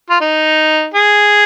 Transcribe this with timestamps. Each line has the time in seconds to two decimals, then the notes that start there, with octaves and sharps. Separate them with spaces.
0.10 F4
0.20 D#4
0.94 G#4